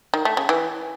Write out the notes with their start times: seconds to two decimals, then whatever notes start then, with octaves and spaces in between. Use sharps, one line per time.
0.14 D#3
0.25 A3
0.37 C#3
0.49 E3